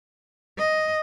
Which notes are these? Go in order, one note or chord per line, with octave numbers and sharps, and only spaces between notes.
D#5